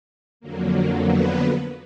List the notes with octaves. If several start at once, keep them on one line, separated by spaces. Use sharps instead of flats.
F2 D3 F#3 A#3
B3 B4